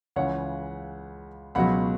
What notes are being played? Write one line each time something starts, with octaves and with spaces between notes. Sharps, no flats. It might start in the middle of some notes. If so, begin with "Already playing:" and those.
C#2 C#3 E3 C#5 F#5
C#2 B2 F#3 F#5 B5